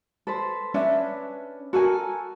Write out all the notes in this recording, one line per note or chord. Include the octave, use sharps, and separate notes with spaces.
A4 B4 C5
C#4 D4 B4 E5
F#4 A4 A#4 G#5